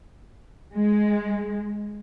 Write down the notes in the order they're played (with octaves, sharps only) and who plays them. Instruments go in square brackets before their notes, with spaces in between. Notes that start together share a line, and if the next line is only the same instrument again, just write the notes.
[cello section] G#3